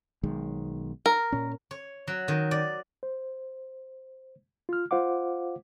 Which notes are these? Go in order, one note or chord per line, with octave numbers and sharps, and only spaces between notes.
B1 D#3 G#3
A#4
A#2 C#4
C#5
F#3
D#3
D5
C5
F4 F6
F4 C5 F5 F#5 D6